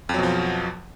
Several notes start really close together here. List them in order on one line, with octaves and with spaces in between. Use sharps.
F2 F#3 B2 F3